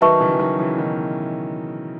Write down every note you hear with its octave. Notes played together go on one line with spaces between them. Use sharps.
D#3 F#3 B4 E5 A5 C#6
C#3 E3
E3
D#3 F#3
C#3 E3
B2 D#3